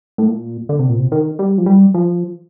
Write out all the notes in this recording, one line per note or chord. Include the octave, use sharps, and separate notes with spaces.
A2
A#2
D3
C3
A#2
C3
D#3
G3
F3
G3
F3